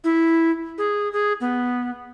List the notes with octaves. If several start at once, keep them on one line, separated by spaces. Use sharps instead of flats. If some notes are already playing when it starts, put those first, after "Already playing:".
E4
G#4
G#4
B3